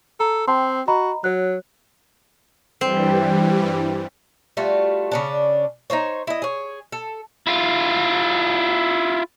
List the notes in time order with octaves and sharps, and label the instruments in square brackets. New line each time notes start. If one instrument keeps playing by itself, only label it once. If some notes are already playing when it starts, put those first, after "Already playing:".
[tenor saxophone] A4 [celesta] A#5
[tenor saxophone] C4 [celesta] G5 A5 C6
[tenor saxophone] F#4 [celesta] D#5 A#5 B5
[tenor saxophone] F#3 [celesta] C#5 F#6
[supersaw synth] G2 E3 G3 [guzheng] C4
[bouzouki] G3 A3 F4 F#4
C#3 C#4 D4
D#4 F4 C5 C#5
E4 D#5
G#4 C#5
A4
[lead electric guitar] E4 F4